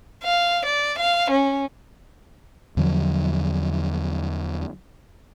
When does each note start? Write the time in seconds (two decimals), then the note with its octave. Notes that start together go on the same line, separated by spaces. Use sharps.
0.23 F5
0.66 D5
0.99 F5
1.31 C#4
2.77 E2 D3 F3 F#3